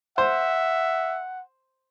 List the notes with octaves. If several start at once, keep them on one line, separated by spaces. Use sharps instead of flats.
C5 E5 F#5